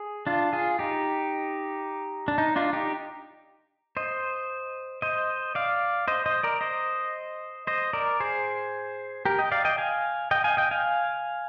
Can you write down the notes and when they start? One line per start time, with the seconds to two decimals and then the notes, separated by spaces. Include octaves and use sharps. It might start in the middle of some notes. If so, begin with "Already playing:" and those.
Already playing: G#4
0.27 D4 F4
0.53 F4 G#4
0.79 D#4 G4
2.28 D4
2.38 D#4
2.56 D4 F4
2.73 D#4 G4
3.97 C5 D#5
5.02 C5 D#5
5.55 D5 F5
6.08 C5 D#5
6.26 C5 D#5
6.43 A#4 D5
6.61 C5 D#5
7.67 C5 D#5
7.93 A#4 D5
8.20 G#4 C5
9.25 G4 A#4
9.39 D#5 G5
9.52 D5 F5
9.65 D#5 G5
9.78 F5 G#5
10.31 D#5 G5
10.44 F5 G#5
10.57 D#5 G5
10.71 F5 G#5